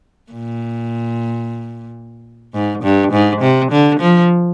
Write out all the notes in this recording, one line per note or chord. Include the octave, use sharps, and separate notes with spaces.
A#2
G#2
G2
G#2
C3
D3
F3